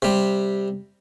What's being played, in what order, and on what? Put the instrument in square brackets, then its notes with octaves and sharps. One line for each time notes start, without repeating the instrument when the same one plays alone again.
[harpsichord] C3 G3